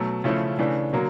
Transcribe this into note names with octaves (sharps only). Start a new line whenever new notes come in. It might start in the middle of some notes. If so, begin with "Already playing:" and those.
Already playing: B2 F#3 A3
C#3 F3 A3 C#4 E4
C#3 E3 A3 D4
D3 F#3 A#3